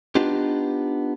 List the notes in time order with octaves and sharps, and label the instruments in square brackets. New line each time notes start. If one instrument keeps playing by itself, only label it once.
[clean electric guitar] B3 D4 D#4 F4 G4